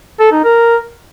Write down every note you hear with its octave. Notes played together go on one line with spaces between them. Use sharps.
A4
D#4
A#4